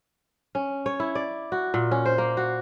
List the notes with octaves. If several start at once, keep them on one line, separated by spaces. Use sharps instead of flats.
C#4
C#5
E4
D5
F#4
A#2
C#4
C5
A#3
F#4